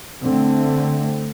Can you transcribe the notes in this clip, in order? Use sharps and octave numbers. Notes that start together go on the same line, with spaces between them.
D3 A3 C4